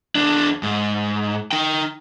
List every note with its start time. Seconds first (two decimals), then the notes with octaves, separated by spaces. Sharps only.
0.15 E2 D4
0.63 G#2
1.52 D#4 G5